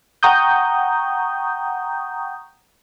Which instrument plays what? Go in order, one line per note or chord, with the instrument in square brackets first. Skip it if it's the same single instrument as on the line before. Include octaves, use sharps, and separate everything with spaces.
[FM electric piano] F#5 G5 A#5 C#6 D#6 G6